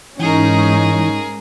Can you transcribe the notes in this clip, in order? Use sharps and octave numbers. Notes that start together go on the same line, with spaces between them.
G#2 E3 C#4 D#4 G#4 A#4